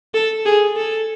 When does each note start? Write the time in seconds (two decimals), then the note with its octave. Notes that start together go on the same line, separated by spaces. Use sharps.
0.14 A4
0.46 G#4
0.76 A4